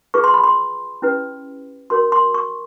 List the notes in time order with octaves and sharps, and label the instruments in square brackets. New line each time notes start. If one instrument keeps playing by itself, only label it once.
[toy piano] F4 G#4 B4 C#6
C6
B5
C6
C#4 E4 G4 B4
F#4 A#4 C#5 C6
C6
C#6